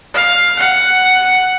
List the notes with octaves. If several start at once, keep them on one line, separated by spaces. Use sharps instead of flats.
F5
F#5